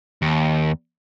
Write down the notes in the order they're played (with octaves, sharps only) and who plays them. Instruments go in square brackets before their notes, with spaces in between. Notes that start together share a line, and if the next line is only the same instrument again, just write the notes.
[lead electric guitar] D#2